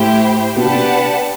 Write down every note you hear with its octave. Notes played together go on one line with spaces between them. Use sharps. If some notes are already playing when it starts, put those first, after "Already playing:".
Already playing: A2 A3 E4 G4 C5 G5
B2 B3 D4 G4 B4 F#5 A5
C3 C4
B2 B3